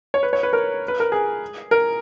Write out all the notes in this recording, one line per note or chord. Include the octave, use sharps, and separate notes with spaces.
C#5
B4
C#5
B4
A#4
B4
A#4
G#4
A#4